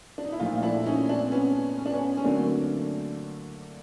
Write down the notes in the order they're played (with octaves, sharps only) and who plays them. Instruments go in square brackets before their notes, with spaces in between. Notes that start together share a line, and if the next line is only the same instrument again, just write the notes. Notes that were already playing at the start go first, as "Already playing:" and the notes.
[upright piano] D4
D#4
E4
[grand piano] A#2 F3 A3 [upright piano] D#4 F4
[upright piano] F4
D4 E4
C#4 D#4
C4 D4
B3 C#4
C#4
D4
B3 C#4
C#4
[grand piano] D3 F#3 A3 D4 F#4 [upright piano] A#3 C4